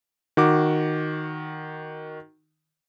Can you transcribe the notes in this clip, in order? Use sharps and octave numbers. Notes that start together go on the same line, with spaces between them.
D#3 F#4 D6